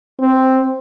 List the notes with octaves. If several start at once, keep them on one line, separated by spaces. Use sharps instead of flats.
C4